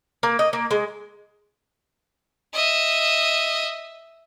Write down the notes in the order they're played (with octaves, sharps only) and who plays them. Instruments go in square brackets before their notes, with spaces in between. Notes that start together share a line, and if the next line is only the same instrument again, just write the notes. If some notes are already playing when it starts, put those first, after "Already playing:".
[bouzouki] A#3
D#5
A#3
G#3
[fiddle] D#5 E5